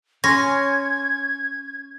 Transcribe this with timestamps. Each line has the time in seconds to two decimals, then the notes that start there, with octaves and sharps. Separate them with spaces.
0.24 C#4 G#5 C6 C#6 G#6 A#6